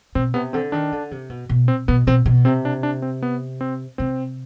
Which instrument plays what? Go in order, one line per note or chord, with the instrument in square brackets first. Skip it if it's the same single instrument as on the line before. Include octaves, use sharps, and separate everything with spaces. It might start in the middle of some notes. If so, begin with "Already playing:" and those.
[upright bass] B2 [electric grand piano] C4
[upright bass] C3 [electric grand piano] B3
[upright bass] D3 [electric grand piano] C4
[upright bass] D#3 [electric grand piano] D4
[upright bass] D3
C3
B2
B2
[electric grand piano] C4
[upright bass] B2 [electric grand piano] B3
[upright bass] B2 [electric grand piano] C4
[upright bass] B2
[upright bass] C3 [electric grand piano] C4
[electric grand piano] D4
D4
C4
B3
C4
[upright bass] C3 [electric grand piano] C4